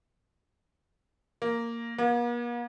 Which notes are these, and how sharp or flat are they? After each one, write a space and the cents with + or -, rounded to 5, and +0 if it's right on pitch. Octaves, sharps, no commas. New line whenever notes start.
A#3 -5
A#3 +45